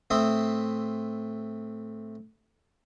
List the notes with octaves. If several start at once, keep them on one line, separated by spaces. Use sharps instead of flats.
A2 C4 E5 C6 D#6